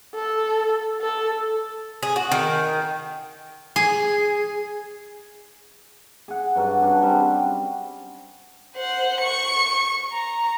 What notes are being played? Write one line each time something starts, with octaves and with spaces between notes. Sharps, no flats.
A4
A4
G#4
F#4
D#3
G#4
G#4 F#5
G2 F#3 F#4 F#5
C#4 D4 G#4
G3 C4
C5 F#5
C#6 C#7
A#5